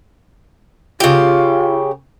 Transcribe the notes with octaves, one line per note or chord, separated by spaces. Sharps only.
C#3 F4 G4